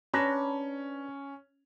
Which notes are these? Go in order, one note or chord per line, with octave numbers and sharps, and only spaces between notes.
C#4 D4 B4 A#5